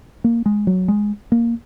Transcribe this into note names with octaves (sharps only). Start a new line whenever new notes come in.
A#3
G#3
F#3
G#3
A#3